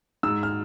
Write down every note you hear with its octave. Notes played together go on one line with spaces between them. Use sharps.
G#2 E6
F6